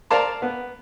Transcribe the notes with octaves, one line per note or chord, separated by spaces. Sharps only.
A#4 C5 D5 F5 A5 C6
B3